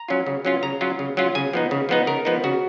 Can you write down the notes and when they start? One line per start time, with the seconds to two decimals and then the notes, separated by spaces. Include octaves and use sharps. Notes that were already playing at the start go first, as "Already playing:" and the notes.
Already playing: A#5
0.08 F#3 C#4 F4
0.27 C#3
0.45 F#3 C#4 F4
0.63 C#3 A#5
0.81 F#3 C#4 F4
0.99 C#3
1.17 F#3 C#4 F4
1.35 C#3 G#5
1.53 F3 B3 D#4
1.71 C#3
1.89 F3 B3 D#4
2.07 C#3 A#4
2.25 F3 B3 D#4
2.44 C#3 F#4